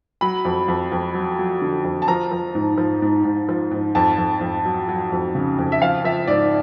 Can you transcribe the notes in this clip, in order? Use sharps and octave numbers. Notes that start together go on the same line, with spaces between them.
F#3 B5
F2
F2
F2
F#3
F#3
D3
F2
A5
F3 A#5
F3
G#2
F3
G#2
G#2
F3
G#2
F2 A5
F2
F2
F#3
F#3
F2
C#3
F2
E5
F3 F5
F3 E5
G#2 D5